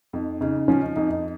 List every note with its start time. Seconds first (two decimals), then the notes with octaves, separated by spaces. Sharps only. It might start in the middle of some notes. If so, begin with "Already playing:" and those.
0.13 F2 D#4
0.41 C#3 D#4
0.68 F3 C#4
0.82 D#4
0.96 F2 D#4
1.10 D#4